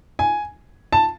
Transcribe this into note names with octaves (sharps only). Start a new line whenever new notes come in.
G#5
A5